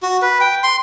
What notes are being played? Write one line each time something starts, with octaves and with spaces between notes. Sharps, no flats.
F#4
B4
G5
C6